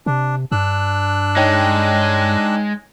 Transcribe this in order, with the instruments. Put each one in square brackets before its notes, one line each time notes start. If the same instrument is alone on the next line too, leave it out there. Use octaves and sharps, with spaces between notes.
[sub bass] C3 [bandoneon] D4
[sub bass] G2 [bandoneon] D4 E6 F#6
[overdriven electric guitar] G#3 [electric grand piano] D#4 C#5 G5